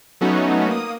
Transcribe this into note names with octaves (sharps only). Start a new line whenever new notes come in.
F#3 A3 B3 C#4 D#4 F#4
A#3 D#6